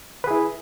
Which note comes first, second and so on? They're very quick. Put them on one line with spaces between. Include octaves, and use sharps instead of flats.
B4 G#4 E4